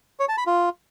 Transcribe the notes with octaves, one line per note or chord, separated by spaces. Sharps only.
C#5
A5
B5
F4